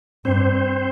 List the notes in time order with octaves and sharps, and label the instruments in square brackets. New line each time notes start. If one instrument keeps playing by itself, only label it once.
[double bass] G2 [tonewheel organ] C4 C5